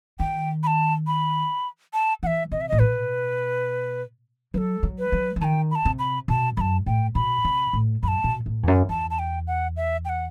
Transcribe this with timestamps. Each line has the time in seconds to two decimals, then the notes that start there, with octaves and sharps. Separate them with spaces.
0.19 D#3 G5
0.63 B5
0.67 A5
1.07 B5
1.93 A5
2.23 E3 F#5
2.27 E5
2.52 C3 D#5
2.61 E5
2.69 D#5
2.72 A2
2.80 B2 B4
4.54 F#3 A4 B4
4.83 F#3
4.98 B4
5.12 F#3
5.36 E3
5.41 D#3 G5 A5
5.71 B5
5.75 A5
5.85 C3
5.99 B5
6.28 B2 A5
6.57 F#2 A5 B5
6.86 A2 G5
7.15 B2 B5
7.45 C3
7.73 A2
8.03 F#2 B5
8.08 A5
8.24 B2
8.46 A2
8.63 E2
8.68 F#2
8.89 E2 A5
9.10 A5
9.19 G5
9.47 F#5
9.77 E5
10.05 G5
10.09 F#5